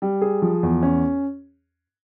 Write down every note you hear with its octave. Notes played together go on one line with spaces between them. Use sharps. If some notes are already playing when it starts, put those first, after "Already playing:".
G3
G#4
F3
E2
C#4